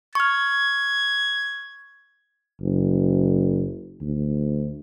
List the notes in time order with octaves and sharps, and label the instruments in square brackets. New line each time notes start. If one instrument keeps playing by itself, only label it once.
[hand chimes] C#6 F6 [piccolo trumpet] G#6
[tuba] F#1
D2